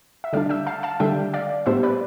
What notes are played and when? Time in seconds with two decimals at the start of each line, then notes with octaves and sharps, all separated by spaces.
0.24 E5
0.33 D3 G3 D4 D5 F5
0.49 E5 G5
0.67 F5 A5
0.83 F5 A5
1.00 D3 G3 D4 E5 G5
1.34 D5 F5
1.66 A2 G3 B3 D4 C5 E5
1.83 B4 D5